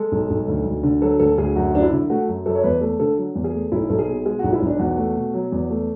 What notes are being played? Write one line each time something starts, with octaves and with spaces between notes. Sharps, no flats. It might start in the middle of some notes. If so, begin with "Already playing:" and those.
Already playing: G#3 A4
B1
B1
D2
D2
D3
F#3 A4
D2 A4
D2 G#4
F#2 F#4
F#2 D4
E4
D3
A3 F#4
F#2
F#2 A4
C#5
E2 B4
A3 A4
D3 A4
F#3
E2
G#4
A3
B1 E4
B1 A4
G#4
B2
G#3 G#4
B1 F#4
E4
B1 D4
E2 F#4
A3
B2
F#3
E2
A3